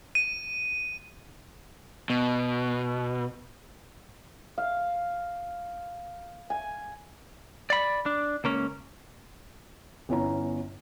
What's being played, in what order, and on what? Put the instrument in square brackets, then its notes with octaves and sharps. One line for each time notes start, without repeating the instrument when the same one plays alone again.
[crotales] D#7
[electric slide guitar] B2
[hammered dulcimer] F5
G#5
[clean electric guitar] D5 B5
D4
C#2 A#3 C#4
[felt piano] G1 B3 C#4 E4 C#5 A#5